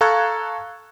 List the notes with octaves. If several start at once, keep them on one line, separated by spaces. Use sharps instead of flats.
A4 F5 A#5 C#6 F#6 G#6